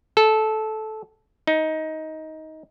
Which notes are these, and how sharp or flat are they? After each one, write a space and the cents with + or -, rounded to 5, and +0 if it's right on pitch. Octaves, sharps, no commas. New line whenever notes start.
A4 -15
D#4 +15